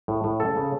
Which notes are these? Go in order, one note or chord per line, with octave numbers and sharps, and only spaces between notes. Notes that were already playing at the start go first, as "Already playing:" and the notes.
A2
A2
C#3 A4
C#3